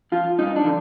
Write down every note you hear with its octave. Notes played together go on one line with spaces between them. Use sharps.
F3 F4
G2 D#4
D4
D3 F3